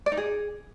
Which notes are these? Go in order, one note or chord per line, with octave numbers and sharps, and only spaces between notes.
D5
D#4
G#4